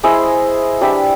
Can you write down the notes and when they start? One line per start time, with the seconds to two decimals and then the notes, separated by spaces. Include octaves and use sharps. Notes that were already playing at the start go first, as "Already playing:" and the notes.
0.03 E4 G#4 C5 D#5
0.81 D4 G4 B4 E5